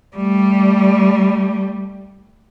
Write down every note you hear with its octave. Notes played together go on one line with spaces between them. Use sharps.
G3 A3